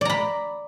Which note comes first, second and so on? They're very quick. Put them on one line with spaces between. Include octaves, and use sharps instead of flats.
D5 A#5 B5